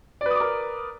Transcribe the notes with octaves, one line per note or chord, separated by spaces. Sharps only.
A#4 B4 D5 D6 D#6